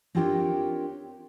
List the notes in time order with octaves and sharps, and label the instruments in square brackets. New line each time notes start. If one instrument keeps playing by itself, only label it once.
[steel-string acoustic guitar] C4 D4 F4 G4 A#4 C#5